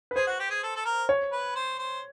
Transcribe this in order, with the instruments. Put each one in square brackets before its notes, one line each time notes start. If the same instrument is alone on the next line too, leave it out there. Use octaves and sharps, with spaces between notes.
[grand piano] B4
[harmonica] G#4 [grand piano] C5
[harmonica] F#4
G4
G#4
A4
A4
A#4
[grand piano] C#5
[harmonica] B4
C5
C5